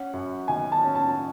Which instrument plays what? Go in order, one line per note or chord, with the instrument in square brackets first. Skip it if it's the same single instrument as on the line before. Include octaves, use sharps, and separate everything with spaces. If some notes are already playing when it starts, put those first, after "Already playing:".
Already playing: [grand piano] C#4 [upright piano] F#5
[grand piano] F#2
[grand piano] D#3 [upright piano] G#5
[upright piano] A5
[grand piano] C#4
[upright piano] A5